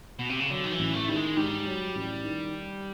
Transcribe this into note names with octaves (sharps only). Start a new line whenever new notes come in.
B2
C3
C#3
D3 F#3
D#3
E3
A1
A3
D#3 G3
G#3
G#2 G3
F#3
A1
D#3